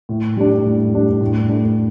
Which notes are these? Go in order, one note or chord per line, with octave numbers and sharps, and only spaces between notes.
A2
G3 D4
A2
G3 D4
A2
A3 D4